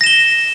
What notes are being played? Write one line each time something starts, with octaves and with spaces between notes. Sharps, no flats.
A#6 E7 G7